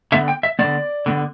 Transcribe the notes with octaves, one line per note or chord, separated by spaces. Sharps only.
D3 B3 E5
G5
E5
D3 B3 D5
D3 B3